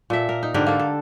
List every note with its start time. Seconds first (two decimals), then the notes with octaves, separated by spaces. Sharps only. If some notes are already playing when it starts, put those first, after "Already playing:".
0.10 A#2 A4 E5
0.29 A#4
0.43 D#4
0.54 G#2 D3 G4 A#4
0.66 A#3 A4
0.79 A4